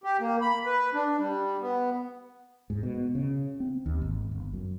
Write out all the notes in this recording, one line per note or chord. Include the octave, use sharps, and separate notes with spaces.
G4
A#3
B5
B4
D4
G3
B3
G#2
B2
C#3
C4
D#2
G#1
G1
F#2